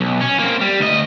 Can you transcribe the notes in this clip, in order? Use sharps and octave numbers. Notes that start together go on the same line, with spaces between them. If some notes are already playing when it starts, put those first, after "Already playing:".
B1
C#4
A#3 C4
G3
D2 D#5